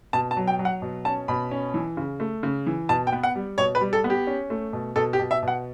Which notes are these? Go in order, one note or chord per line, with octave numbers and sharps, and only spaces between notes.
B2 A5
A5
F#3
G5
F#3
F#5
B2
C#4 A5
B2 B5
C#4
E3
C#3
A3
C#3
E3
B2 A5
G5
B3
F#5
G3
B2 C#5
B4
G3
A4
B3
G4
C#4
A3
B2
B2 A4
G4
B2
E5
B2
F#5